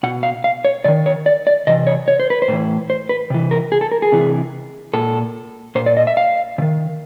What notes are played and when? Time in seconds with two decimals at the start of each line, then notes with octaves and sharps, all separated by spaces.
0.03 B2 F#5
0.23 F5
0.44 F5
0.65 C#5
0.84 C3 D5
0.88 D#3
1.06 C#5
1.26 D5
1.47 D5
1.67 C3 E3 D#5
1.87 C#5
2.08 C#5
2.20 C5
2.30 B4
2.42 C5
2.48 A2 E3
2.90 C5
3.09 B4
3.30 C3 E3
3.51 A#4
3.72 G#4
3.81 A4
3.92 A#4
4.02 G#4
4.12 C3 E3
4.94 A#2 A4
5.75 A#2 C5
5.86 D5
5.97 D#5
6.07 E5
6.17 F5
6.58 C3
6.62 D#3